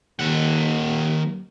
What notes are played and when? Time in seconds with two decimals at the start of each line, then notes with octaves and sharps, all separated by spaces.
0.19 D#2 D#3 F#5